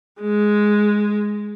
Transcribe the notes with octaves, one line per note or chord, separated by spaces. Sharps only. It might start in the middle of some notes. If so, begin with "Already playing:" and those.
G#3